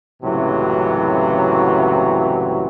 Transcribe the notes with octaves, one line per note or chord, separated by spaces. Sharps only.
C#2 F#2 A2 C3 E3 F#3